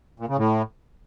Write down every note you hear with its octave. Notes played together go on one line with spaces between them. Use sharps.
A#2
C#3
A2